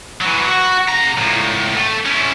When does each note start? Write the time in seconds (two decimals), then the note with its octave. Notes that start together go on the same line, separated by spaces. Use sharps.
0.21 E3 F#3
0.47 F#4
0.88 C#3 A#5
1.17 C#2 A2
1.77 A3
2.06 C#4 E4